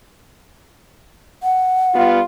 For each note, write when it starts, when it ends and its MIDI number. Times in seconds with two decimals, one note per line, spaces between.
1.43 2.11 78
1.94 2.20 55
1.94 2.20 59
1.94 2.20 65